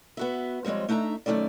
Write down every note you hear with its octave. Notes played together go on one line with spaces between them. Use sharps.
B3 F#4 E5
F3 G3 G#3 C4 C#5
A3 D4 D#4 E5 A#5
F#2 D#3 A3 C#4 D5